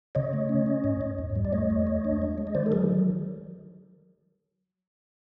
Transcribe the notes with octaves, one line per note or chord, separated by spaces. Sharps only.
C#3 C#5 D#5
A3
C#4
C#4
G#2
G#2
E2
G3
D5
A3 C#5 D#5
E2
A3
D4
G#3
G#3
D#5
D#3 C5 D5
A4
F#3 G#4 A#4